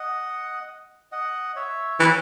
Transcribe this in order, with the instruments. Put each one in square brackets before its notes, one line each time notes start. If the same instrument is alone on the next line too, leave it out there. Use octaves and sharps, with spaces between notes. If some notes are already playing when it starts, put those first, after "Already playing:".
Already playing: [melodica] D#5 F#5
D#5 F#5
C#5 E5
[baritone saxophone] E3